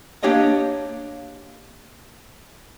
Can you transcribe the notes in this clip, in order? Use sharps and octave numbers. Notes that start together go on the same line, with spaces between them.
A#3 D4 G4 C#5 D#5 F5